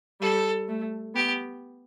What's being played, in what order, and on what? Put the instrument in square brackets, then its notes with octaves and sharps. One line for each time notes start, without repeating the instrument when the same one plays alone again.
[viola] G3 [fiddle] A4
[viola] A3
[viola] B3 [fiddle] G4